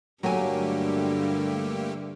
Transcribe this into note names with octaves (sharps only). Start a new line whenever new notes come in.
G2 D3 F#3 A3 A#3 G4 G#5